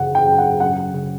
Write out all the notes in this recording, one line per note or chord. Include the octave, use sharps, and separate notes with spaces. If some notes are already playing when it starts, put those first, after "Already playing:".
Already playing: G#1 F#2 C#3 F#5
G5
F#2
F#5
F#2 F#5
C#3